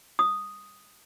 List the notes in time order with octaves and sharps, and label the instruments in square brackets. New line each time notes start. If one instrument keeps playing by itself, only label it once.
[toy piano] D#6